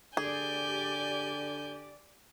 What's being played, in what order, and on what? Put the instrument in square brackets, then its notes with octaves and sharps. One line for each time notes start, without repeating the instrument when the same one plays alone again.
[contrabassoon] D3 [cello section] G4 D5 [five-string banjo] G#4 [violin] G#5 G6